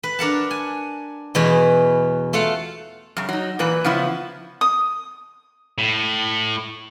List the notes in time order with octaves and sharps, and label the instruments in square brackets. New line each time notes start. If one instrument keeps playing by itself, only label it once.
[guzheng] B4
D4 A#4 F#5 A5
G#5
E2 B2 C#4 B5
A3 F4 F5 F#5
[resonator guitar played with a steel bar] F#2 C#3
F#3 D#4
A#2 E3 B4
C#3 F3 B3 E4
[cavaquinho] D#6
[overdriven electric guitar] A2